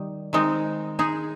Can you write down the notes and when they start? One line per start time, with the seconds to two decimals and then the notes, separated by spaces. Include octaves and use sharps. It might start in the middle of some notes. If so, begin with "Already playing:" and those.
Already playing: D#3 G3
0.33 D#3 G#3 C4 D#4
0.99 G#3 D#4 G#4